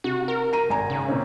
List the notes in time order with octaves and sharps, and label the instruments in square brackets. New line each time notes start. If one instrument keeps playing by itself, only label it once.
[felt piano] C3 [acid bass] F#4
[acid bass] A#4
[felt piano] A#5 D#7
G#1 G#5 A#5
[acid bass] C#3
[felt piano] A#2 C4 C#4